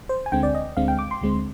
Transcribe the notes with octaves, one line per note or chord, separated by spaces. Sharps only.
C5
G#5
D2 D3 G#3 C4 G5
D5
D#5
D2 D3 G#3 C4 F5
G5
D6
C6
D2 D3 G#3 C4